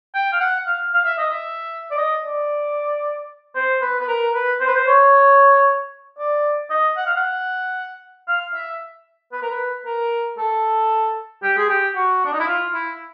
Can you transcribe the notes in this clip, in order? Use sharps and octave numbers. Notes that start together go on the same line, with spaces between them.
G5
F5
F#5
F5
F5
E5
D#5
E5
D5
D#5
D5
C5
B4
B4
A#4
B4
C5
B4
C5
C#5
D5
D#5
F#5
F5
F#5
F5
E5
B4
A#4
B4
A#4
A4
G4
G#4
G4
F#4
D4
D#4
E4
F4
E4